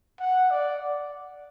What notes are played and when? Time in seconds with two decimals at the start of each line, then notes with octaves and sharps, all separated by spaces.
0.20 F#5
0.50 D5